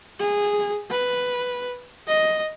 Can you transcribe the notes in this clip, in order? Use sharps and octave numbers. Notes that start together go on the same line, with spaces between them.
G#4
B4
D#5